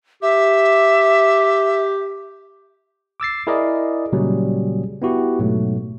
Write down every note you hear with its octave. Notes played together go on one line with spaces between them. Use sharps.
G4 E5
D6 E6 A6 C7
E4 G#4 A#4 D5 D#5
A#2 C#3 F#3 G3 A#3 G#4
B3 E4 F#4 G4
G#2 B2 F#3 A3